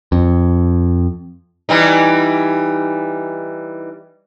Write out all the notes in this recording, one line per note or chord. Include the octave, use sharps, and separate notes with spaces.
F2
E3 G3 D#4